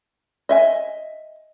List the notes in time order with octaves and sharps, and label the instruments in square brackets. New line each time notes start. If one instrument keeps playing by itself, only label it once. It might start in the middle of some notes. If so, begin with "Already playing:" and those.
[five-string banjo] D#5 E5 G#5